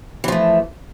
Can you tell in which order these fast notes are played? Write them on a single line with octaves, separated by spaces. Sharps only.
E3 F3 A3